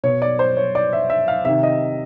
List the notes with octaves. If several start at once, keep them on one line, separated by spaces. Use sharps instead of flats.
B2 C#5
D5
C5
C#5
D5
E5
E5
F5
C3 D#3 E5
D#5